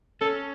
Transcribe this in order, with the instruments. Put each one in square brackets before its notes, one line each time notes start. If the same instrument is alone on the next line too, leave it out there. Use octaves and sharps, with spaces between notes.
[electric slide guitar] C#4 [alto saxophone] A4